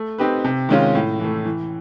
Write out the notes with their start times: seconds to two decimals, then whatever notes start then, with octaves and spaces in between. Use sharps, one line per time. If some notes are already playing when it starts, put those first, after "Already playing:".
Already playing: A3
0.18 C4 D#4 G4 B4
0.44 C3
0.69 D#3 G#3 C#4 F4
0.95 A2
1.19 E3 A3
1.45 E3